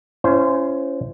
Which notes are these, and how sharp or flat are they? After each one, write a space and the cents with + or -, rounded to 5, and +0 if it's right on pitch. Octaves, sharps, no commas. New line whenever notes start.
C#4 +0 E4 +35 C5 -20